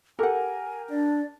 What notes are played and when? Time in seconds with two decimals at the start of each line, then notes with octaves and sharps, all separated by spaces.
0.19 G4 A4 A#4 F#5 G#5
0.90 D4 D5